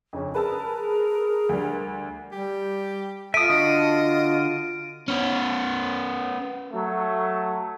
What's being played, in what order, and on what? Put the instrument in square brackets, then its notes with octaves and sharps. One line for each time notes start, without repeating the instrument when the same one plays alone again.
[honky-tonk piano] F2 C#3 C#4
[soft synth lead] G#4 [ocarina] A#4 [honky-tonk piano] B4 A5 E6
[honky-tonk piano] D2 G3
[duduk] G3 [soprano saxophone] G4
[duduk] F4 [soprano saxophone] A4 [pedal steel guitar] E5 D#6 [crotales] D7 D#7
[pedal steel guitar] D3 D4 F#4 [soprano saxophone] D#5
[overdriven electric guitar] B3 C#4
[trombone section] F#3 A3